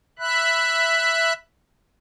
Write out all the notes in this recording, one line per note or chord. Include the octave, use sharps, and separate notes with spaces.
E5 B5 F#6